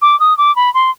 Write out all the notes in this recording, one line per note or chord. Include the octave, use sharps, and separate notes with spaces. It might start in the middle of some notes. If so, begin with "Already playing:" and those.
D6
D#6
D6
B5
C6